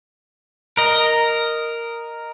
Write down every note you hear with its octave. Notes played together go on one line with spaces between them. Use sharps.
A#4 D#5